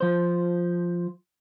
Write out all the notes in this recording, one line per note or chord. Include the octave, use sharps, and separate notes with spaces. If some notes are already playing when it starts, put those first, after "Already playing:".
F3 C5